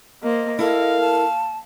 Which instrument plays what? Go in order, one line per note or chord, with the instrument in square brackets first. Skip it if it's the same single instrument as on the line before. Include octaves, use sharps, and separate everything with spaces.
[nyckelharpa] A#3 C5 [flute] D#5
[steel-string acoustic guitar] E4 A4 [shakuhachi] A#4 [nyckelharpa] F5
[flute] A5